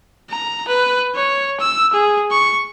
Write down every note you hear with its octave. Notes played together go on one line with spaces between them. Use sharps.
A#5
B4
C#5
E6
G#4
C#6